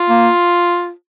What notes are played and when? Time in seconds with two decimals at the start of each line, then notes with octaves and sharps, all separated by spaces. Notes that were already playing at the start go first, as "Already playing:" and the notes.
Already playing: F4
0.09 A#3